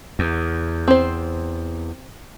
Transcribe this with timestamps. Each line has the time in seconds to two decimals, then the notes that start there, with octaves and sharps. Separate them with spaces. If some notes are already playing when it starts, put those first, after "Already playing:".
0.19 E2
0.88 C4 C5